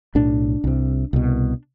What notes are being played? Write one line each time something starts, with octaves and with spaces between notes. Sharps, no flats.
B1 A2 D4
C2 C3
C2 B2